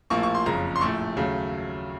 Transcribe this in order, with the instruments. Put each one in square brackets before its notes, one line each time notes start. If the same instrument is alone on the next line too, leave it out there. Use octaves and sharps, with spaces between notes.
[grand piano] A#1 A2 F3 A#3 C#6
C#6
C6
F#1 F2 C#3 A#5
C6
A#1 A2 A3 C#6
D#2 C#3 F#3 A3